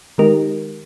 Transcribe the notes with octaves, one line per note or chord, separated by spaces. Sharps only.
D#3 G#3 D#4 G4 A#4